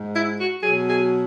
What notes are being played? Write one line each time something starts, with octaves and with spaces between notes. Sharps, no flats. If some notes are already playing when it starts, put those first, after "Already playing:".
Already playing: G#2 G#3
E4
F#4
B2 F#3 G#4
G#4